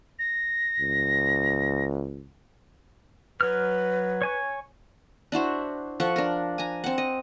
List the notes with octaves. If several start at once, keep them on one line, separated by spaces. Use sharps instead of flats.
A#6
C#2
F#3 B4 F6
C#5 G#5 C#6
D4 E4 F#4 C5
F3 A4 F#5 C#6
D4 A#4
G#5 A#5
C4 F#5
D#5